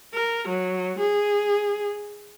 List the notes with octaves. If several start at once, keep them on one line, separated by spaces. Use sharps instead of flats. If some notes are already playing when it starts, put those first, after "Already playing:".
A#4
F#3
G#4